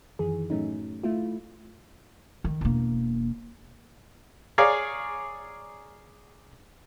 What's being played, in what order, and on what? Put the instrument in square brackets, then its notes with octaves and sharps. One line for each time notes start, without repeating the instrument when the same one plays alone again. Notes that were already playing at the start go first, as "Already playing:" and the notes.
[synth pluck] F#2 D#3 E3 G#4
A2 F#3 A3 C#4 D#4
A3 E4 F4
[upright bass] D#3
E1 A#3
[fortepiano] G#4 C#5 D5 F5 A#5